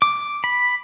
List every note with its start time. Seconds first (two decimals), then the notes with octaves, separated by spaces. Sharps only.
0.02 D6
0.44 B5